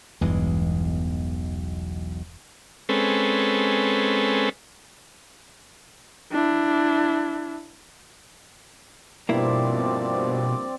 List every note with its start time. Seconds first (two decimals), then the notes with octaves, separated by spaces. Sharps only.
0.21 E1 B1 E2 G2 E3 G#3
2.89 G#3 C4 C#4 A4 B4
6.32 D4 E4
9.29 G2 B2 F3 A#3 C4 E4 D5